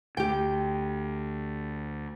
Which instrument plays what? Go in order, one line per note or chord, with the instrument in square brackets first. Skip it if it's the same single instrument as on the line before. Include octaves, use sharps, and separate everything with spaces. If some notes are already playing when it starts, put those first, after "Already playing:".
[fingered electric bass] D2 [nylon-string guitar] G4 G5